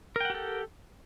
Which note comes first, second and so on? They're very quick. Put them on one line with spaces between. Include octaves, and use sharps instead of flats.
A#4 G5 F#5 G4 A4